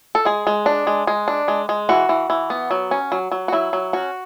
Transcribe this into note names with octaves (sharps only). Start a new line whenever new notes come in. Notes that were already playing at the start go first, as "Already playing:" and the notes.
A4
G#3 G#4
G#3
D4
G#3
G#3
D4
G#3
G#3
E3 F#4
E3
E3
B3
F#3
C#4
F#3
F#3
F#4
F#3 E4
F#3
C#4 F#4